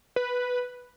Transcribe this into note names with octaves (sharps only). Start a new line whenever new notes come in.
B4